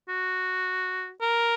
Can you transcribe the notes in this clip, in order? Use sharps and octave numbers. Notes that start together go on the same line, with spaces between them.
F#4
A#4